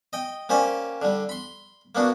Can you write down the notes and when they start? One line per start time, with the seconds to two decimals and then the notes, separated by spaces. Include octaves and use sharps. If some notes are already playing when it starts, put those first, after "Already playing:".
0.13 D#5 G5
0.49 A#3 C#4 G4 C5 D5
1.02 D3 G3
1.29 B5 C6
1.95 A#3 B3 D4 F#4